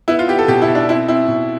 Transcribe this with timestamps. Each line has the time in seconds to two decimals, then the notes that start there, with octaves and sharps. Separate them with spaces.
0.08 B3 E4
0.19 F4
0.28 B3 G4
0.38 A4
0.48 B2 G4
0.62 E4
0.68 B2
0.75 D4
0.89 C4 E4
1.08 C4 E4
1.28 B2